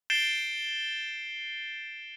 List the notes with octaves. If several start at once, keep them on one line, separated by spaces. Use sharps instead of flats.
G6 A6 C7 D7 E7 G7